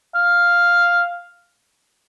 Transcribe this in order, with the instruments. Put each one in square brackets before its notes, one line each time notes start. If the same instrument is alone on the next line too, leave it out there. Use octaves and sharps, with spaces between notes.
[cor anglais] F5